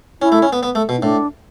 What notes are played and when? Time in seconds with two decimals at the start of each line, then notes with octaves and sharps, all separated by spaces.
0.22 C#4 E4
0.32 A3
0.42 C#4
0.53 B3
0.63 B3
0.75 A3
0.89 B2
0.98 E4
1.02 A2 D4